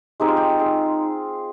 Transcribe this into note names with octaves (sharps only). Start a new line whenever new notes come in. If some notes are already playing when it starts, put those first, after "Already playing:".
G#3 C4 D#4 G4
F4
G4
G#4